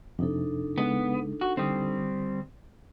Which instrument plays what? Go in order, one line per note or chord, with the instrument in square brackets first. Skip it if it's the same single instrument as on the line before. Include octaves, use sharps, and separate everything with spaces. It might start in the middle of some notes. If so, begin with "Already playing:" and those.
[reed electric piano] F2 C3 [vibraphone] D4 D#4 A4
[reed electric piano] C#3 G#3 [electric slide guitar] B3
[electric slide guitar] F#4
[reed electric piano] D3 D#6 [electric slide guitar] G3 C4